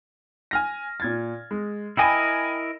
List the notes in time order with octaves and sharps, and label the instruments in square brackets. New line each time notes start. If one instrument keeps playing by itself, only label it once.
[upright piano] G#5 F6 A#6
A#2 G#6 A6
G#3
[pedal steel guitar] E4 A#4 D#5 [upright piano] G5 G#5 B5